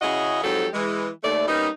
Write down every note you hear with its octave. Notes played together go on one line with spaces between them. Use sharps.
C#3 C#4 E4 F#4 G#4 D#5
F2 G#2 F#3 F#4 G4 A4
E3 G#3
D#2 A3 D5
G3 A#3 B3 C#4 D#4